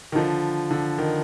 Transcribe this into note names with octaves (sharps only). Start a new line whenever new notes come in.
D#3
D3 F3
D3
D#3